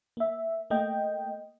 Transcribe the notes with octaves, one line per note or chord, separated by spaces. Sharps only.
A#3 E5
A3 A#3 D#5 G5